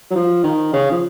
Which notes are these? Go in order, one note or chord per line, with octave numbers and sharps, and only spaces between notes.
F#3
F3
D#3
C#3
F3